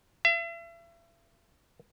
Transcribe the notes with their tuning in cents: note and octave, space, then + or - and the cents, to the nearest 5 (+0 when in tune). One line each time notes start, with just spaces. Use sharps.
E5 +40